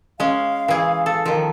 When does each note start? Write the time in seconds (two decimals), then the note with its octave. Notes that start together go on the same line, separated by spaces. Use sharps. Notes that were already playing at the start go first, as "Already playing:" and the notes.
0.20 G#3 C#4 F5
0.68 E3 G#4
1.06 A4
1.26 D#3 F3